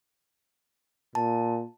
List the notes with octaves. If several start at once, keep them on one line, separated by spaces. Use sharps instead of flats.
A#2 A5